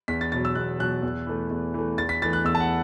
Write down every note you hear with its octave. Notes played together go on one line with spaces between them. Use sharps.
E2 B6
A6
B2 F#3 A6
E6
E2 F#6
B2 F#3 F#6
E2
E3 A3
E2
E3 A3
E2 A6
B6
E3 A3 A6
F#6
E2 E6
A5
F#5